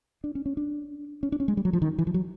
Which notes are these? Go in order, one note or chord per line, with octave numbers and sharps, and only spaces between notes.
D4
C#4
C#4
D4
C#4
D4
C#4
G#3
G3
F#3
F3
D#3
E3
F3
F#3